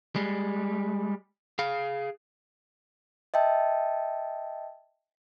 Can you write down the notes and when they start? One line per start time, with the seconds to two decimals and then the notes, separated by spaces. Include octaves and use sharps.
0.16 G3 G#3
1.59 G#4 F5
3.34 D#5 E5 G5 A5